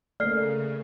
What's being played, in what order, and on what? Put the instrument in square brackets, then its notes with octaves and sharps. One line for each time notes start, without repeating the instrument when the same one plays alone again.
[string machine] C#3 [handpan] A3 A#3 [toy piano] D5 [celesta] F6 C7